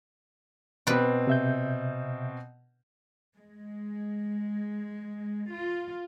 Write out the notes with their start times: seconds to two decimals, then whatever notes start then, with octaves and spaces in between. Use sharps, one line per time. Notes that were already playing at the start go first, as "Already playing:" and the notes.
0.87 B2 C4 B4 D5
1.27 C3 E5 G6
3.37 G#3
5.52 F4